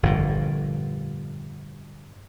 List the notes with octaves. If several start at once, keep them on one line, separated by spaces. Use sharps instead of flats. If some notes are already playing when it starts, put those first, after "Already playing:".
G1 F2 A#2